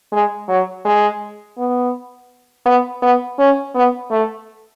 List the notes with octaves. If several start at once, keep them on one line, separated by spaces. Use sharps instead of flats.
G#3
F#3
G#3
B3
B3
B3
C#4
B3
A3